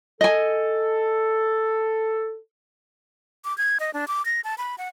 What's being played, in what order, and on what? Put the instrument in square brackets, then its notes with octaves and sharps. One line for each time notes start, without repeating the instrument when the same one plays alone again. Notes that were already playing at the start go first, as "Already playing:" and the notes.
[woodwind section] A4 [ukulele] D#5 G#5
[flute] D6
G#6
D#5
D4
D6
A#6
A5
B5
F#5